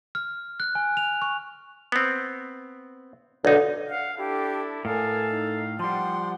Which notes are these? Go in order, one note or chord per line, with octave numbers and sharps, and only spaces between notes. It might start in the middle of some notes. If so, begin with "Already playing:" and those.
F6
F#6
G#5
F7
C#6
B3 C4
B1 D3 D#4
F5 F#5
D4 E4 G4 A4
A2 A4 A#4 F5 G#5
D#4
F3 G3 F#5 G5 C6